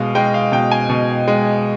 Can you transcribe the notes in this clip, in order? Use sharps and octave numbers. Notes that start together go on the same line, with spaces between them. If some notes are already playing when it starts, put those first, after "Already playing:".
Already playing: B2 G#3 D#5 F5
G#3 G5
F5
B2 G5
G#5
B2
G#3